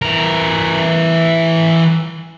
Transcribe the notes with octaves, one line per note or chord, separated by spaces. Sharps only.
E3 A#4